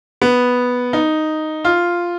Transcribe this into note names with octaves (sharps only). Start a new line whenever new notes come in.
B3
D#4
F4